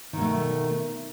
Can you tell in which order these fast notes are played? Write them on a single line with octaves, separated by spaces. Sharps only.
D#3 B2 A3